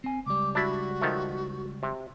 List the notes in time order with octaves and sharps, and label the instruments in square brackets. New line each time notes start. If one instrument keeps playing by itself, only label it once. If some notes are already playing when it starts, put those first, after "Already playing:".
[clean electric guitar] C4 G#5
[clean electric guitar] C#2 G3 [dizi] D6
[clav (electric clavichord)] D4 E4 [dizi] F#4
[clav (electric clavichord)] D#3 F3 A3
C3